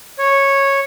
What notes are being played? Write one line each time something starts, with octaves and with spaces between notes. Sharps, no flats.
C#5